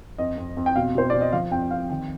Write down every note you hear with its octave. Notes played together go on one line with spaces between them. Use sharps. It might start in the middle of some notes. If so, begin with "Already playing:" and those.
F2 D#5
F2
F2
G5
B2 F5
B2 C5
B2 D5
D#5
F3 F5
F2 G5
F2 F5
D#3 G5